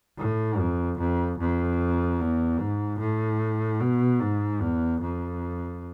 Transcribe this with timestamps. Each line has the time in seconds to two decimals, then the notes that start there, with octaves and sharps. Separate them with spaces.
0.18 A2
0.59 F2
0.99 F2
1.39 F2
2.20 E2
2.60 G#2
2.99 A2
3.80 B2
4.21 G#2
4.61 E2
5.01 F2